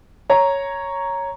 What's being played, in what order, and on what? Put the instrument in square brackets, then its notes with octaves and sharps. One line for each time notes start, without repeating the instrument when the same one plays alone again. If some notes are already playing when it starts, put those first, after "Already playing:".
[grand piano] C#5 A#5